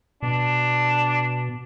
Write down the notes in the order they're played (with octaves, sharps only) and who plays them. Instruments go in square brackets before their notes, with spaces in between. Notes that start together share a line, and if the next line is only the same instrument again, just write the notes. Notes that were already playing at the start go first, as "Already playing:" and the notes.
[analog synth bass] B2 [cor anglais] D4